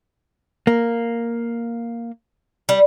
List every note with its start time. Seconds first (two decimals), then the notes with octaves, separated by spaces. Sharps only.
0.67 A#3
2.69 G3